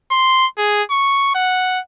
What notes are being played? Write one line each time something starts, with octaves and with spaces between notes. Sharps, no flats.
C6
G#4
C#6
F#5